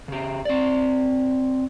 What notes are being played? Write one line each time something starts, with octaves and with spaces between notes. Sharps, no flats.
C#3 G4
C4 D5